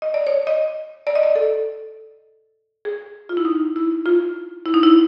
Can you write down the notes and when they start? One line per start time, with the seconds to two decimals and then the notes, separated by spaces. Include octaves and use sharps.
0.02 D#5
0.14 D5
0.27 C#5
0.47 D#5
1.07 D5
1.15 D#5
1.23 D5
1.35 A4
2.85 G#4
3.29 F4
3.37 E4
3.45 D#4
3.76 E4
4.06 F4
4.66 E4
4.74 D#4
4.83 E4